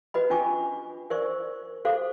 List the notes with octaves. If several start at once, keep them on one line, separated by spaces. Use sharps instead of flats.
F#4 B4 D#5 B5
C#4 D4 F4 G#5 C#6 D6
A#4 C5 D5 C#6
F#4 A4 C5 F5 D6